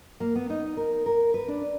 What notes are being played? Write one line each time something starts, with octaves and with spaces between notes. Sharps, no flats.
A#3
B3
D#4
A#4
A#4
B4
D4